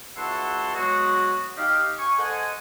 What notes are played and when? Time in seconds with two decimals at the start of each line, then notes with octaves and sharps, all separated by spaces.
0.17 C#2 E4 F#4 F#5 A5 C6
0.75 F#3 G#3 B3 F#4
1.57 D#4 G4 F5
1.99 G#5 C#6
2.18 A4 C5 D#5 F#5 G#5